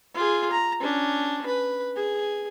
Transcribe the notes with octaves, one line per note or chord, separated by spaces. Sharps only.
F4 G#4
A#5
C#4 D4
B4
G#4